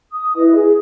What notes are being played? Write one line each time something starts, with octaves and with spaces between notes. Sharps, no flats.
D#6
E4 B4 D#5
G#4